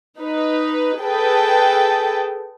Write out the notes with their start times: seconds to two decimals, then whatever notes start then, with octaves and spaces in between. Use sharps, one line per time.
0.18 D#4 B4
1.02 G#4 A4 B4 G5